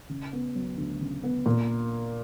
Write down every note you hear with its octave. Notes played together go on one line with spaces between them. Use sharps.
C#3
B3
F#3
D2
C#3
B3
A#2